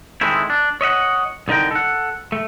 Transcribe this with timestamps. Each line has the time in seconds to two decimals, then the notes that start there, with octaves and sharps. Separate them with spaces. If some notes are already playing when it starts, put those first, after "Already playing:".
0.21 D#3 G#3 A3 C4 E4
0.50 D4
0.81 C#5 D#5 E5 F#5
1.48 C2 D3 D#4 A#4 G5
1.71 A4 F#5
2.32 A3